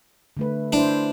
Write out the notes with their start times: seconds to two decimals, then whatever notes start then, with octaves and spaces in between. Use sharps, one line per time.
0.37 D3 A3 B4
0.73 D4 E4 C5